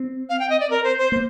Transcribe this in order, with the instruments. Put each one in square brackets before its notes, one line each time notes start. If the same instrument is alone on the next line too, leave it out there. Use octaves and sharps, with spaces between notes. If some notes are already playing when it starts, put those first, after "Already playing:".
Already playing: [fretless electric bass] C4
[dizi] F5
G5
D#5
D5
A#4
C5
C5
[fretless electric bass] A#3 [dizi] C5